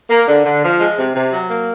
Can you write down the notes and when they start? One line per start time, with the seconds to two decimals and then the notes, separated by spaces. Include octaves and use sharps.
0.10 A#3
0.28 D3
0.46 D3
0.63 F3
0.80 G#3
0.98 C3
1.15 C3
1.32 F#3
1.50 A#3